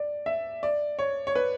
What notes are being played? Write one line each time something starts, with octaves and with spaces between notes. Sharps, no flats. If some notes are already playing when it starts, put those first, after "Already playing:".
Already playing: D5
E5
D5
C#5
C#5
B4